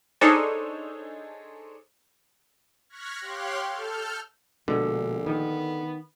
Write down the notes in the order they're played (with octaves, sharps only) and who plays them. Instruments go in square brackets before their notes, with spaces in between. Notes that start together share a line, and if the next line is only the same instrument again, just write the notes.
[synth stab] D4 D#4 G#4 A4 C5 C#5
[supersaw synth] C#6 F6 F#6 G#6 A#6 B6
G4 C#5 F5 C6 F#6
A4 F6 G6
[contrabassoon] A#1 [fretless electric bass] B2 G#3 [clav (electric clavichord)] D3
[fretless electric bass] D#3 [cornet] B3